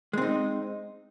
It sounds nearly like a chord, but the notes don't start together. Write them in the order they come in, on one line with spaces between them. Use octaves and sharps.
G#3 C4 D#4